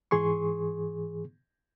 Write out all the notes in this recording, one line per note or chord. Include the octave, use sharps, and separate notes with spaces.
G#2 E3 G#4 C6 C#6